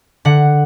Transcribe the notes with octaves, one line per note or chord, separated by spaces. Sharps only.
D3 F#5